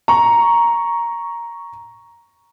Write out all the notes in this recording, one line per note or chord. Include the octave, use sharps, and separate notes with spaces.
A#5 C#6